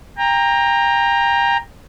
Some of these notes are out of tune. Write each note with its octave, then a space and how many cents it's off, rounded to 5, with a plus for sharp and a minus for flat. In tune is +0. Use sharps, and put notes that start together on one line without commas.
G5 +30 A#5 +0